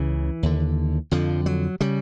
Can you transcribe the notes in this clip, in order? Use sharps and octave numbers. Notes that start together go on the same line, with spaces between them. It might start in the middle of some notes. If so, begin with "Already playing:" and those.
Already playing: C#2 C#3 E3
D#2 D3
F2 D3 F3
F#3
C#3 G3